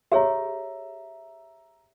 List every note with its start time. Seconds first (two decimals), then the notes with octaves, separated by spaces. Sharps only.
0.12 G4 G#4 C#5 E5 A#5